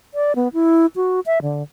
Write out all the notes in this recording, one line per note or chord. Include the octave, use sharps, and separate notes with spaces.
D5
B3
E4
F#4
E5
D3